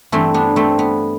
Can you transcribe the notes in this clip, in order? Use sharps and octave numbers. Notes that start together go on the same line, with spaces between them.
G2 E3 A3 C4
B3 D4
A3 C4
B3